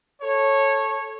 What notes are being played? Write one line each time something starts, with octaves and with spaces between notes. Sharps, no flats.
A4 C#5